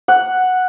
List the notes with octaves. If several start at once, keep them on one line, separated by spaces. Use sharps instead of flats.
F#5